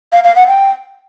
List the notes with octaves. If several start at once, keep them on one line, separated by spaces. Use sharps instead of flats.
F5
F5
F#5
G5